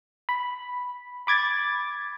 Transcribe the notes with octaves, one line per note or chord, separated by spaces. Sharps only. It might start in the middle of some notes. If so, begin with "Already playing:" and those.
B5
B5 D6 G#6 A6